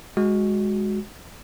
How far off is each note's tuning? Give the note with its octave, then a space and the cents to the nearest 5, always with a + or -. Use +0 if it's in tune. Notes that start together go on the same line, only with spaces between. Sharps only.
G#3 +0 F#4 +0